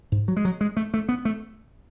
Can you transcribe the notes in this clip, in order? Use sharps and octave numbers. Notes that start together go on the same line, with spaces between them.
G#2
F#3
G#3
F#3
G#3
A3
A3
B3
A3